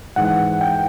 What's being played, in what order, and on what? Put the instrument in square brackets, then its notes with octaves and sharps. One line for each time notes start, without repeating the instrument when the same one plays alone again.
[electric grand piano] G#2 E3 F#5
G5